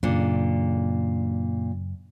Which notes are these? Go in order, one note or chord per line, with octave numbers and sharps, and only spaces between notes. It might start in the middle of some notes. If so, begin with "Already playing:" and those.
F#2 A#2 C#3 D4